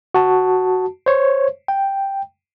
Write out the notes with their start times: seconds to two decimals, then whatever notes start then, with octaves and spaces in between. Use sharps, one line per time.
0.15 F#4 A5
1.06 C5 C#5
1.68 G5